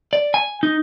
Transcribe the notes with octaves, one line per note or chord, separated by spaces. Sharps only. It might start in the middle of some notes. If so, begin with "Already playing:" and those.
D5
G#5
D#4